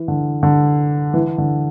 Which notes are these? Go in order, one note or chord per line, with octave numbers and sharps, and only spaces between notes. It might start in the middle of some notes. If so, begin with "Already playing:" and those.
Already playing: E3
D3
D3
E3
D3